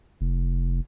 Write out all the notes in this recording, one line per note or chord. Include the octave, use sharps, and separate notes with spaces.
F1